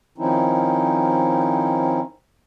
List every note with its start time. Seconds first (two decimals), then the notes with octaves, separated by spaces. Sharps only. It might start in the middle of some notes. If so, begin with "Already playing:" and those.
0.18 D#3 F3 C4 C#4 D#4 E4